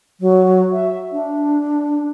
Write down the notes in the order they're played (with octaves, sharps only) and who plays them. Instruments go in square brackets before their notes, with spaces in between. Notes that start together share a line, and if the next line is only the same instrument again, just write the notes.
[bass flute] F#3
E5
D4